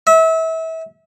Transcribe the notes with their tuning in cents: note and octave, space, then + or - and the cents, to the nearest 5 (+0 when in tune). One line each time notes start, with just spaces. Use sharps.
E5 -30